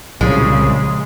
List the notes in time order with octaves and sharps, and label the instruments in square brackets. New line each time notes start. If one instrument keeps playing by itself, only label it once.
[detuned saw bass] C2 [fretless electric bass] A#2 F3 F#3 [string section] C#3 [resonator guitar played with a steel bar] G#3